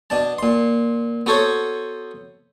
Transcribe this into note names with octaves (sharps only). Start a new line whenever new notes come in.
B2 D4 A5
A#2 C6
B3 F#4 A4 C5 C#5